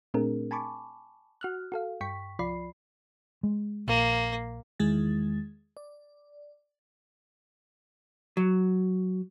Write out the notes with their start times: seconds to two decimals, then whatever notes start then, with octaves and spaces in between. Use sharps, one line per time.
0.14 A#2 A3 C4 D4 G#4 A#4
0.51 G#5 A5 B5 C#6 D6
1.41 F#4 F6 F#6
1.72 F#4 A4 F5
2.01 G2 G5 C#6 B6
2.39 C2 F3 F4 D5 B5 C7
3.43 G#3
3.87 A#1 A#3
4.80 E2 D#3 G#3 E4 G#4 A6
5.77 D5
8.37 F#3